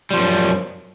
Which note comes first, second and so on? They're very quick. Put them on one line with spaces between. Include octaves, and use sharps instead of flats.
G3 F3 F#2